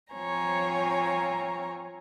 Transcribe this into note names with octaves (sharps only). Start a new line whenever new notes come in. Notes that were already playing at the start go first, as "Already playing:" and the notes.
F3 C4 C#5 G#5 A#5